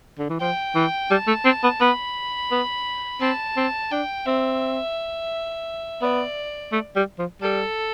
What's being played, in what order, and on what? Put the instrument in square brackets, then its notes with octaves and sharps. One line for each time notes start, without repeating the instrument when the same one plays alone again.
[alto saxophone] D3
E3
[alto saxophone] F3 [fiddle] G5
[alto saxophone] E3
[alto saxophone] G3 [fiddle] A5
[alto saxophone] A3
C4
B3
[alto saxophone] B3 [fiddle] B5
[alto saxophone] B3
[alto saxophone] C4 [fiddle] A5
[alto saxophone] C4
[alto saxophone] D4 [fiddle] G5
[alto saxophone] C4 [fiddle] E5
[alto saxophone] B3 [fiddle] D5
[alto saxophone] A3
G3
F3
[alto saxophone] G3 [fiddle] A4